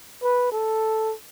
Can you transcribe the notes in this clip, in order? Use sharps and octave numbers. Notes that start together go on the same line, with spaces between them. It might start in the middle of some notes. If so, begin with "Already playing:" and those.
B4
A4